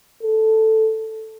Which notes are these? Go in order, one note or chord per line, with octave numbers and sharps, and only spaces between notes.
A4